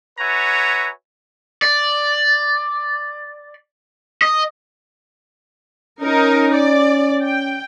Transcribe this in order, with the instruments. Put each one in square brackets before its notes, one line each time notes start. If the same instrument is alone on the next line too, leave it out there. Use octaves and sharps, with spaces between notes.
[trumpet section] F#4 B4 C#5 E5 G#5 A#5
[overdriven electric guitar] D5
D#5
[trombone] C#4 [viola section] D#4 A#4
[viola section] D5
G5